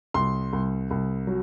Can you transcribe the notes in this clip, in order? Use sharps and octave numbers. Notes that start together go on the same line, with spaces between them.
C2 C6
C2
C2
F#3